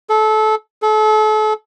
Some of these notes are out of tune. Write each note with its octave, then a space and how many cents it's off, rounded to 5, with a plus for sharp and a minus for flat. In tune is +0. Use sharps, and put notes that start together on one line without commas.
A4 -25
A4 -35